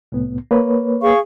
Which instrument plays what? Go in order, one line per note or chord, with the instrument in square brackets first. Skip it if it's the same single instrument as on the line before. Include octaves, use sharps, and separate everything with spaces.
[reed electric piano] C2 A2 B3
A#3 B4 C#5
[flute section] G#4 F5 C#6